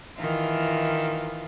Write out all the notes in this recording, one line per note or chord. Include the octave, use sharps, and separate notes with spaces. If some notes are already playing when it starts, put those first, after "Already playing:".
D#3 E3 F4